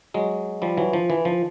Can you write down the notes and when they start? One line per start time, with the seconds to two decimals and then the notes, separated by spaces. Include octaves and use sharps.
0.14 F#3 G#3
0.62 F3 G3
0.77 E3 F#3
0.93 F3
1.10 E3
1.25 F3